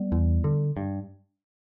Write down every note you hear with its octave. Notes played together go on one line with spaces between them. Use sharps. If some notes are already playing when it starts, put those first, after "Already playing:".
Already playing: G3 B3
E2
D3
G2